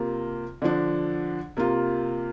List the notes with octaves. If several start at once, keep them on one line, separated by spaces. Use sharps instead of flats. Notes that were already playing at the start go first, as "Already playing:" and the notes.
Already playing: C3 A#3 F4
D3 F3 D4
C3 A#3 F4